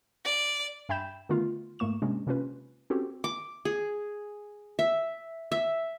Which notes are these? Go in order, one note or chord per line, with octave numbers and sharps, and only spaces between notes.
D5
G2 E5 G5 B5 G6 E7
D3 D#3 A3 B3 F4
G#2 A3 A#3 C#6 E7
C3 G#3 A#3 C#4 D4
C3 A#3 C#4 F4 B4
C4 C#4 F#4 G4 A4
D6
G#4
E5
E5